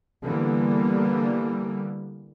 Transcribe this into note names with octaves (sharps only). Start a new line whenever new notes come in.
D3 E3 G3 A#3 B3